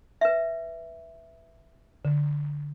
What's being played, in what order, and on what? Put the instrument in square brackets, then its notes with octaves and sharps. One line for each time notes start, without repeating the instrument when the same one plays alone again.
[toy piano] B4 E5
[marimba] D3